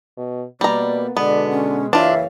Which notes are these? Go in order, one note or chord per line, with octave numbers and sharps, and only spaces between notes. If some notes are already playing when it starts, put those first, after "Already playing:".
B2
B2 G3 A#3 B3 D5 A#5
B2 D3 G#3 B3 D5
C#4
F#1 E3 D4 F4 C#5 E5 F5